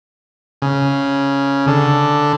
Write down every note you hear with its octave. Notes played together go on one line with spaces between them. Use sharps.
C#3
D3